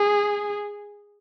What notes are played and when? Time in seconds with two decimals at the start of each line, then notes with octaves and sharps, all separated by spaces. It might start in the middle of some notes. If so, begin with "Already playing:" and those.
Already playing: G#4